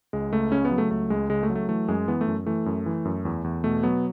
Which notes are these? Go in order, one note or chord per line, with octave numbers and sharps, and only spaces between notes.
C#2 G#3
C#2 A3
C#3 C#4
B3
F#3
A3
C#2 A3
C#2 G#3
C#3 G#3
A3
F#3
A3
E3 A3
F#2 G#3
E3 B3
A3
F#2
E3 A3
F#2
E3
F#2
E2
E2
B2 A3
F#3 B3